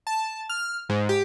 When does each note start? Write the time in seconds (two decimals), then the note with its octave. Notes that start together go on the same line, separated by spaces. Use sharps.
0.07 A5
0.49 F6
0.89 G#2
1.09 G4